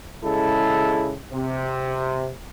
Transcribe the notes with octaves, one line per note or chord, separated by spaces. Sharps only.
C#3 G#3 E4 A4
C3